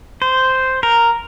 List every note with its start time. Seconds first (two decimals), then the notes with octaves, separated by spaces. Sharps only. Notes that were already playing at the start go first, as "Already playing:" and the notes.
0.22 C5
0.83 A#4